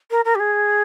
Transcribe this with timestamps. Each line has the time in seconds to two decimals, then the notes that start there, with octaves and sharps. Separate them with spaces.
0.11 A#4
0.25 A#4
0.35 G4
0.40 G#4